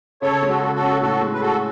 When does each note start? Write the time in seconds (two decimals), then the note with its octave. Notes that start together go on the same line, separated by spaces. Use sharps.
0.22 C#3 A4 C#5
0.43 G#3
0.49 F#4 A4
0.61 C#3
0.75 F#4 A4
0.81 C#4
1.01 A2 F#4 A4
1.21 G#3
1.33 B4
1.41 F#4 G#4 A4